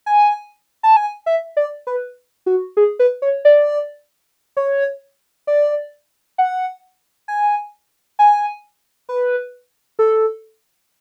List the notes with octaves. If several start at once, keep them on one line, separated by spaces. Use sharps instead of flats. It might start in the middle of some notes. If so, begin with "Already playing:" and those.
G#5
A5
G#5
E5
D5
B4
F#4
G#4
B4
C#5
D5
C#5
D5
F#5
G#5
G#5
B4
A4